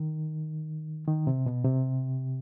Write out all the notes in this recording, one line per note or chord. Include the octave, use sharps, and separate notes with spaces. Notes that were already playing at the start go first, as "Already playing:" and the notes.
Already playing: D#3
D#3
C3
B2
C3